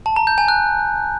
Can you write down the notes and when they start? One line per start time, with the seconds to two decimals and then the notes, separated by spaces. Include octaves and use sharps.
0.06 A5
0.16 A#5
0.27 G6
0.38 G#5
0.48 F#6